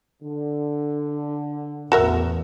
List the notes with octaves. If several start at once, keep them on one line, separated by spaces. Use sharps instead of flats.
D3
A1 E2 F#4 A#4 E5